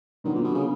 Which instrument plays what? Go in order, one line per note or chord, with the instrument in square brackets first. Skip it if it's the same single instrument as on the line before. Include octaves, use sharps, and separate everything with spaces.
[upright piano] D3 F#3 B3 [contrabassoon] D#3
[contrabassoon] A#2
B2
C#3